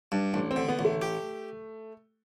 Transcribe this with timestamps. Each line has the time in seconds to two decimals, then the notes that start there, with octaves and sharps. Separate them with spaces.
0.12 G2 D4
0.33 A1 D4
0.51 C4
0.56 D3
0.68 B3
0.79 A1
0.85 A3
1.02 G4